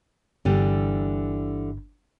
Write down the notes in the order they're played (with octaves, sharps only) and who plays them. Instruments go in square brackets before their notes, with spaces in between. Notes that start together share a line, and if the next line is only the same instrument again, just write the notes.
[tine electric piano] G1 [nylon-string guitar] D3 E3 G3